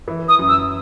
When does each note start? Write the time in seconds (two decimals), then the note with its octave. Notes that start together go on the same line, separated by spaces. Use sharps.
0.08 E3
0.29 D#6
0.39 F#2
0.49 E6